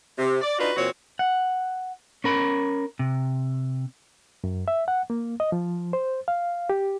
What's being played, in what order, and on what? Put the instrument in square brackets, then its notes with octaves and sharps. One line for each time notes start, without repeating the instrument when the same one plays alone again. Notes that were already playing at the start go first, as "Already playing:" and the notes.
[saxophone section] C3
D5
D4 D#4 F4 F#4 B4
A#2 E3 C4 F#4 C#5
[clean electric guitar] F#5
C#4 A#4 B5
C3
[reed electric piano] F#2
E5
F#5
A#3
D#5
F3
C5
F5
G4